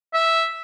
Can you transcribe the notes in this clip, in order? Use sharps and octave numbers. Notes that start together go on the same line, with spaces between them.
E5